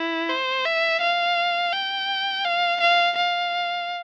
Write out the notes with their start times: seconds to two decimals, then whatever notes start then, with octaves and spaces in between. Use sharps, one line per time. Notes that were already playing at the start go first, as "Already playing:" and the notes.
Already playing: E4
0.29 C5
0.66 E5
1.01 F5
1.73 G5
2.45 F5
2.81 F5
3.17 F5